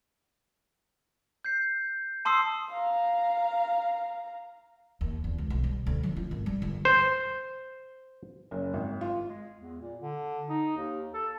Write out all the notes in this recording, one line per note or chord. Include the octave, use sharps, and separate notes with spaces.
G6 C7
A5 C6 D#6 E6 C7
F5 A#5
D#2
E2
C#2
B1
G3
D2
F#3
F4
G#1
G3
G1
C5
F#1
G#1
F4
G#3
E2
A#2
D3
D#4
D#2
A4